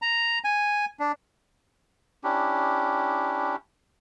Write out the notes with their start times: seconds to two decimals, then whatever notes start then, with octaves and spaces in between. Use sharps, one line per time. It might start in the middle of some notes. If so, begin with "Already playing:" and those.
0.02 A#5
0.44 G#5
1.00 D4
2.24 C#4 D4 E4 G4